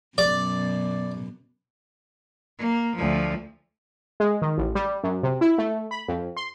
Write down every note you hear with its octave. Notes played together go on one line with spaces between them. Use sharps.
F#2 B2 D5
A#3
D2 F3
G#3
D#3
A1
G3
F#2
C3
E4
A3
B5
F2
C6